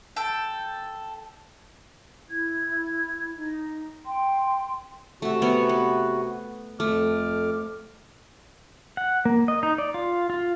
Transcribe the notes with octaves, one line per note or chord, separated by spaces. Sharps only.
A4 G5
E4 G#6
D#4
G5 C6
C3 A3 F#4 E5
B3 C#5
B4
F2 A3 D6 F6
F#5
A#3
D#5
D#4
D5
F4
F4